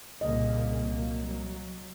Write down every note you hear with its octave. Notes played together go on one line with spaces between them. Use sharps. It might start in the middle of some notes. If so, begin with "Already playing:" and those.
C2 A#2 C#3 A#3 D#5
F#3